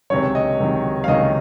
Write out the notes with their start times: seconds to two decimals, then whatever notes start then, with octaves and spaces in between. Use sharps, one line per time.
0.10 C#2 C3 D#3 F#3 C#5
0.35 D#5
0.60 C#2 C3 D#3 F#3
1.04 F5
1.08 C#2 C3 D#3 F#3 D#5